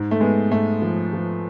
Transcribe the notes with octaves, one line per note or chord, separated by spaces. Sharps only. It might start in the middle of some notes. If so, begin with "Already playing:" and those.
Already playing: G#2
A3
G#3 B3
G#2 A3
F3
F3